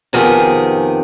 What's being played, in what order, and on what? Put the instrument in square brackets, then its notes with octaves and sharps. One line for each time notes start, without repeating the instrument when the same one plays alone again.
[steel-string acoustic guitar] F2 C3 D#3 B3 G#4